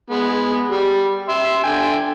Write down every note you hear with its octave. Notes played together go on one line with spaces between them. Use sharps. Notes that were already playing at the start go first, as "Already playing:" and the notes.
G#3 B3
G3
E5 C6
D3 G5 G#5